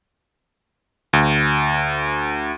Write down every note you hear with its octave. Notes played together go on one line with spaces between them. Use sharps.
D2